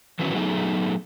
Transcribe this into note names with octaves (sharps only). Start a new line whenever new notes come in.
D#3 E3 F#3 B3 C#4
F#3 A3 B3 D#4 G#4